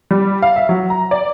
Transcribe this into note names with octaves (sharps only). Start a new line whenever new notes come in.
G3
F5
E5
F#3
A#5
D5